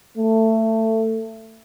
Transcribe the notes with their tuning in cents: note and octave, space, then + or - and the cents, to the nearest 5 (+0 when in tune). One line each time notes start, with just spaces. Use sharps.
A3 +20